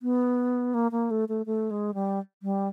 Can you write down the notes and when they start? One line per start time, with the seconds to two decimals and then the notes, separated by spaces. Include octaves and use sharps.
0.02 B3
0.74 A#3
0.92 A#3
1.11 A3
1.29 A3
1.46 A3
1.71 G#3
1.94 G3
2.43 G3